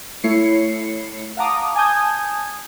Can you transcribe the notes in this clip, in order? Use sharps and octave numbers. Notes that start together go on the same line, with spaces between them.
A3 E4 C#5 C7 C#7
F5 F#5 A5 A#5 D6 D#6
G#5 A5 D#6 G6 G#6